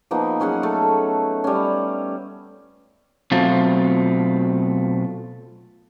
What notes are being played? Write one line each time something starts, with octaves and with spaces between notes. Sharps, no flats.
F3 A#3 B3 D#4
F#3 C#4 G#4 F#5
A3 A4
G3 C#4
B2 F#3 A3 C4 F4